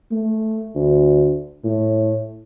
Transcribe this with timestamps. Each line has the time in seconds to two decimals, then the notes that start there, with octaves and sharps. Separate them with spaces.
0.12 A3
0.76 D2
1.64 A2